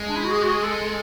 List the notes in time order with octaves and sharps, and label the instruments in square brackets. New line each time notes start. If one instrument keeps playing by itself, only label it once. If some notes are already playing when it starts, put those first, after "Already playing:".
Already playing: [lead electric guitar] G#3
[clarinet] D4
E4
F#4
G#4
F#4
G#4
A4